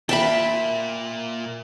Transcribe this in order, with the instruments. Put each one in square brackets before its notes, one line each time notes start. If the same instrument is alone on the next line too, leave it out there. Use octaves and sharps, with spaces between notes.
[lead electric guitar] A#2 A#3 [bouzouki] E5 A5 [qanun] G5 B5